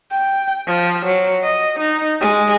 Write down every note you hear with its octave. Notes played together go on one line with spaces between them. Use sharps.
G5
F3
F#3
D#5
D#4
G#3